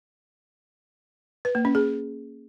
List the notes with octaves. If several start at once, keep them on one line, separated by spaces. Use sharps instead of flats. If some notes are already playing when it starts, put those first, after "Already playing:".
B4
A#3
C#4
G#4